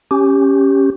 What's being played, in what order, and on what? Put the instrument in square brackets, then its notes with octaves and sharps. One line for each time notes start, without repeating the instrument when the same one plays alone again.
[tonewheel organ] C#4 G4